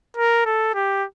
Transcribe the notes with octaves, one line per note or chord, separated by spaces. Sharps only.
A#4
A4
G4